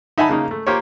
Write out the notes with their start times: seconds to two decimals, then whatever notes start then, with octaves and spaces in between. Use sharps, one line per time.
0.18 D#4 E5 F#5 G#5 A5 B5
0.29 C#3 A#3 D#4
0.51 A3
0.67 A#3 F4 G4 C5 C#5